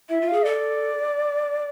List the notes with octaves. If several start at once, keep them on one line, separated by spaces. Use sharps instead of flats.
E4 E5
F4
F5
G#4
A4 D5